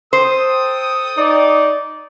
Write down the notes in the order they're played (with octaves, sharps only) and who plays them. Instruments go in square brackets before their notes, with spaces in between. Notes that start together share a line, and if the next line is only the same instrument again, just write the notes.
[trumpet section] A4 G5 D#6 [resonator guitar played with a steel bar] C5
[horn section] D#4 D5